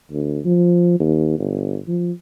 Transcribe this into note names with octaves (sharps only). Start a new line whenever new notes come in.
D2
F3
D#2
G1
F3